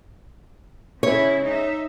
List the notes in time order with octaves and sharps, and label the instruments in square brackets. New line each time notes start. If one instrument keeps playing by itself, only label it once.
[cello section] C#3 E4 [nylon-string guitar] C#5
[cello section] D#4 E5